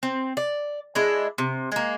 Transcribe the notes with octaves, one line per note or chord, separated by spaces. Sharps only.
C4
D5
G#3 D4 E4
C3
G#3 A#3